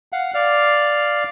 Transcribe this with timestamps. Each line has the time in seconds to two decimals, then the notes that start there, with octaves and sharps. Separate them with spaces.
0.12 F5 F#5
0.34 D5 F5 F6